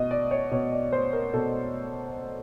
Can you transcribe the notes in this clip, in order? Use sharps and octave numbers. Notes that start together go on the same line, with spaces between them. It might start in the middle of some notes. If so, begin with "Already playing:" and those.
Already playing: B2 D#5
D5
C#5
B2 C#5
D5
C5
A#4
B2 A4